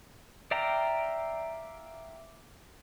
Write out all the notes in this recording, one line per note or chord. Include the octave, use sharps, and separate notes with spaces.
D5 E5 F5 G5 A#5